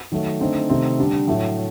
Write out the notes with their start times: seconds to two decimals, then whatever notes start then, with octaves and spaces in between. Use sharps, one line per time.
0.12 D#3 F#3 A3
0.40 D3 A3 C4 D#4
0.69 C3 D#3 A3 C4 D#4
0.98 D3 G3 D4
1.27 A2 F#3 A3